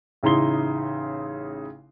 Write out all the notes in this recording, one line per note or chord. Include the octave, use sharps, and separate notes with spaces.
A1 C#3 D#4 E4 C6 G7